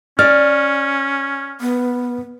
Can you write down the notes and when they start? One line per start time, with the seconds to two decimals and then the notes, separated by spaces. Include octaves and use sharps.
0.19 C#4 D5 F6
1.61 B3